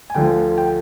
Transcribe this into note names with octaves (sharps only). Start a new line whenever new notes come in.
G#5
D2 D3 F3 G5
G5